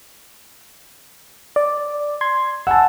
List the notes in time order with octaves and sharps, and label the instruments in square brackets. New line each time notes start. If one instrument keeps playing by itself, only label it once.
[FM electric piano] D5
C6 G#6
[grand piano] F#5 G#5 A5 [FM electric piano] E6